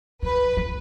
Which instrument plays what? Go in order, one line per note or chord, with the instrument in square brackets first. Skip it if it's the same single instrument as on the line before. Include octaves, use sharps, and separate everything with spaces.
[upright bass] F3 [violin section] B4
[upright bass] F3